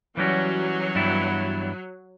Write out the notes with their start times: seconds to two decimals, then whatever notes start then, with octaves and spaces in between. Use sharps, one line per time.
0.17 E3 F#3 G3 C#4 F#4
0.95 G2 E3 G3 B3 E4